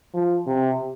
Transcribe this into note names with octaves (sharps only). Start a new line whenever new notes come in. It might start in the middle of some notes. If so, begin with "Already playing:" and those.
F3
C3